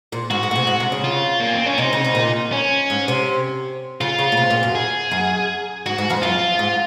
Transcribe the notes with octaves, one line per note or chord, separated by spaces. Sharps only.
A#2
G#2 F#4
G#2
A#2
C3
G#2
C3
C#3
F4
A#3
C4
C#4
C3 D#4
C#3
C3
A#2
C#4
G#2
C3
C#3 F4
C#3
A#2
C3
A#2
F#2
G#4
F#2
G#2 F#4
G#2
F2 F3
F#2 F4
G#2